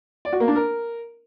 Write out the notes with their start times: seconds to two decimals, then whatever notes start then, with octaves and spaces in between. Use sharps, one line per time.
0.25 D5
0.33 F#4
0.40 A#3
0.48 D4
0.55 A#4